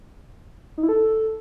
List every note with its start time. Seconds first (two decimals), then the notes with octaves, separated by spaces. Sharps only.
0.78 D#4
0.83 E4
0.89 A4